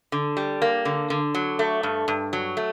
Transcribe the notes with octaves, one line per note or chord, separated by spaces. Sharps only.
D3
G3
A#3
D3
D3
F#3
A3
G2
G2
F#3
A3